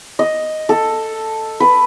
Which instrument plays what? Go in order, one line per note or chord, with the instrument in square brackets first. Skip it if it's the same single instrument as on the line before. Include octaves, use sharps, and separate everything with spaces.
[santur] D#5
A4
B4